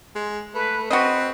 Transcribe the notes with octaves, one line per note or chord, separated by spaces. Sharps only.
G#3
A3 B4
C4 F#4 B4 D#5